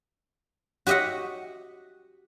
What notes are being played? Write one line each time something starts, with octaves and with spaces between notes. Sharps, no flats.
F#4 G4 D#5 E5 F#5